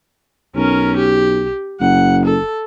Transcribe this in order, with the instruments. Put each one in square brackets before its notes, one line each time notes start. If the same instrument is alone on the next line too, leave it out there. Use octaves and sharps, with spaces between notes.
[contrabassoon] B1 [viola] C#4 A#4
[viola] G4
[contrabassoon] F#1 [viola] F#5
[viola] A4